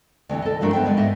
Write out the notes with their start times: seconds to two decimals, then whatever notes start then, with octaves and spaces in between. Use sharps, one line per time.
0.29 D2 C3 D#3 E3
0.42 A4 D#5
0.60 G2 F3 F#3 A3 D4 A#4
0.73 B3 C5 E5 G5
0.85 D2 G#3 D5
0.97 G#2 A#3 D#5 E5